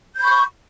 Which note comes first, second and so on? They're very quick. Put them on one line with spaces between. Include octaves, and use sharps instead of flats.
G6 B5 C#6